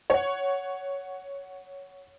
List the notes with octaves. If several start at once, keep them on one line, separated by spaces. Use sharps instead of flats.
C#5 F#5